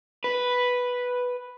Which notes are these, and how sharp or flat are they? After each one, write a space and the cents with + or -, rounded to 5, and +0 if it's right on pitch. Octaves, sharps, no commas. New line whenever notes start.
B4 +0